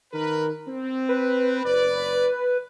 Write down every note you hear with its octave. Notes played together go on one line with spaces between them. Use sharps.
D#3 A#4 B4
C4
B4
F#1 D5